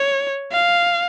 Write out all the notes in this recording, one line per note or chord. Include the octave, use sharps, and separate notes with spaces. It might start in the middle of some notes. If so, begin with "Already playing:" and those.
Already playing: C#5
F5